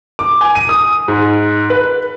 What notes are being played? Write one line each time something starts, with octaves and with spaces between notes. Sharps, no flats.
D6
G#5
D#7
D#6
G#2
B4